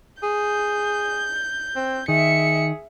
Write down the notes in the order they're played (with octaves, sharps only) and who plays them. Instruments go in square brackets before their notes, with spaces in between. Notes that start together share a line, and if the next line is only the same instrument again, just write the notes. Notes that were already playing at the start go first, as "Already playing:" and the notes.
[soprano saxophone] G#4 [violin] G6
[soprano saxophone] C4
[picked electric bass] D#3 [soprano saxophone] G#4 [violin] E5 C#7